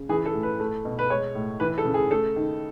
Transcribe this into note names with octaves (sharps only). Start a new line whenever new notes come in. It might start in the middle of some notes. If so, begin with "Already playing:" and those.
Already playing: C#3
E3 G#4
A4
A2
B4
A3
B2
B4
G#3 C#5
A2
E3 B4
A4
C#3
G#4
A3 A4
D#3